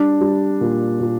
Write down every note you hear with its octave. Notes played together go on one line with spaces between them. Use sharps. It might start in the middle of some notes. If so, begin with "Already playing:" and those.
Already playing: G3 D4
G3
A#2
A#2